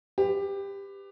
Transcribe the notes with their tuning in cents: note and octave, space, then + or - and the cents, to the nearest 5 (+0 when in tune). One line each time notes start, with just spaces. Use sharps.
G4 +15 B4 +30